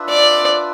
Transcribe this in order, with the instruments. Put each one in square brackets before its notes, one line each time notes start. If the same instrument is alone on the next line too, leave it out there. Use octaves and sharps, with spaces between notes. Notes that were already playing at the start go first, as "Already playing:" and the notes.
Already playing: [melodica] D4 F4 B4 E5
[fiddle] D5